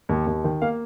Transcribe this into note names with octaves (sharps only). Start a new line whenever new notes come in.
D#2
D#2
D#3
A#3 F5